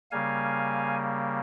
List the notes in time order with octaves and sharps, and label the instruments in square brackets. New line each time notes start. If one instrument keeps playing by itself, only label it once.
[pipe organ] C#3 G3 A#3 F5 G#5